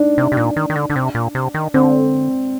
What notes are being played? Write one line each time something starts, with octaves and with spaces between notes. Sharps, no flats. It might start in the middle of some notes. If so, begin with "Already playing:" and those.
Already playing: D4 D#4
C3
C3
A#2
D#3
D#3
D3
D3
C3
A#2
C3
D#3
D3 C4